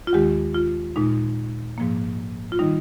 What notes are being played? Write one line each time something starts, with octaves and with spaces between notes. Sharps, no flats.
F4
D#2 D#3 G#3 G4
F4
A#2 G#3 D#4
G#2 F3 A#3
F4
D#3 G3 D#4